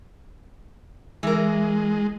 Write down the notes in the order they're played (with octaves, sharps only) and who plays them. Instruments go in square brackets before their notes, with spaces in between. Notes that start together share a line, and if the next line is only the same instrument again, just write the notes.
[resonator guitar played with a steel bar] E3 A#4 [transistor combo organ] G#3